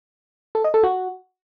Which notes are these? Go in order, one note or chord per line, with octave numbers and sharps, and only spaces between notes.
A4
D#5
A4
F#4